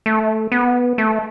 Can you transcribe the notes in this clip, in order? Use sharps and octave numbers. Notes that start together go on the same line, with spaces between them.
A3
B3
A3